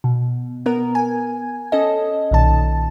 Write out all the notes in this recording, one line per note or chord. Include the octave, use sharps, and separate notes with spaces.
B2
B3 A#4
G#5
C#4 A4 D#5
B1 A#2 D#3 A5